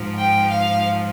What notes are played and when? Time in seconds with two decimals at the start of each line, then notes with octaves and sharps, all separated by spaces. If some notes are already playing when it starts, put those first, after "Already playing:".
Already playing: G#2 F3
0.20 G5
0.51 F5